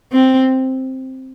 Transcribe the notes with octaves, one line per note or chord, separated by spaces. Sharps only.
C4